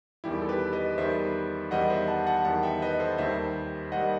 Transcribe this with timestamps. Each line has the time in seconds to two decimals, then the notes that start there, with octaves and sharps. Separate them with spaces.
0.24 E2 D#3 G3 E4 G4
0.42 A4
0.49 G4 B4
0.73 B4 D#5
0.97 E2 D#3 G3 C5 E5
1.71 E2 D#3 G3 D#5 F#5
1.90 C5 E5
2.08 F#5 A5
2.27 F#5 A5
2.45 E2 D#3 G3 F#5 A5
2.63 E5 G5
2.82 B4 D#5
2.99 A4 C5
3.18 D#2 D#3 G3 C5 E5
3.92 D#2 D#3 G3 D#5 F#5